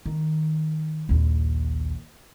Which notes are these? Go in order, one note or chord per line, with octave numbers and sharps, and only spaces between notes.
D#3
A#1 D#2